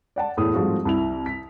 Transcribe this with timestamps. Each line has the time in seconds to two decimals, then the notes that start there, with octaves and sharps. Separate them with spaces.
0.16 D5 F#5 A5
0.37 E2 A2 D#6
0.54 G#2 F3 G3 A3 C4 F#4
0.85 C2 E4 F7
1.26 B6